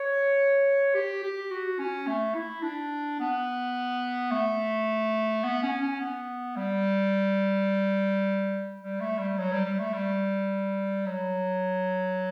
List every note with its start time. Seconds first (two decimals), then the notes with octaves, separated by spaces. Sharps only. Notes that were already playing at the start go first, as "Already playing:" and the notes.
Already playing: C#5
0.95 G4
1.23 G4
1.51 F#4
1.79 C#4
2.07 A3
2.35 E4
2.63 D4
3.20 B3
4.31 A3
5.44 B3
5.63 C#4
5.82 C#4
6.00 B3
6.57 G3
8.81 G3
9.01 A3
9.19 G3
9.38 F#3
9.52 G3
9.65 G3
9.79 A3
9.94 G3
11.06 F#3